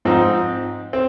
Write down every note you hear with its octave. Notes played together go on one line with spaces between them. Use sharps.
G#2 F3 C4 D#4
C4